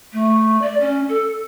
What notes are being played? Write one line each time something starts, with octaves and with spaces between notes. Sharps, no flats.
A3
D5
C#4
A4